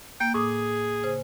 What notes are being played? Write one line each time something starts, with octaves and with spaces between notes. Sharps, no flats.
A#3 G5
A2 G#4 D6 D#6
C#3 C5 G#5